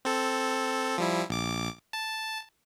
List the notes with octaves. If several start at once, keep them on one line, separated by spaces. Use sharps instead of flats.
C4 A4
F3 G3 E4
A#1 D6
A5